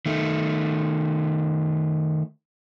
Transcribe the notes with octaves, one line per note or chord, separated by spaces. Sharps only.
D#3 A3